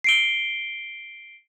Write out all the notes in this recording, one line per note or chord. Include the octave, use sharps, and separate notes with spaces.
C7 D7 G7